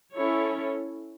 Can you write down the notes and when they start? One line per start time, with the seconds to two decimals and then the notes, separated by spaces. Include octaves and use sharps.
0.14 C#4 E4 A4 C#5